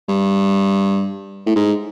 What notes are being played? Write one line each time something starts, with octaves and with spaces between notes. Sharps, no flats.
G2
A2
G#2